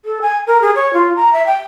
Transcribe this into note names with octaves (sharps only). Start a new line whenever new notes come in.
A4
G#5
A#4
G#4
C#5
F4
A#5
E5
G5